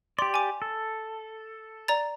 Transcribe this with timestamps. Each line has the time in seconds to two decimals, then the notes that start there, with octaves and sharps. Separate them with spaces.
0.19 G4 D5 C6
0.34 G#5 D6
0.62 A4
1.88 D5 A#5 A6